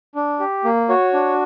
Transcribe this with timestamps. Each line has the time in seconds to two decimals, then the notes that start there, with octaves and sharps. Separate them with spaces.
0.15 D4
0.40 G4
0.64 A#3
0.89 F#4 C#5
1.13 D4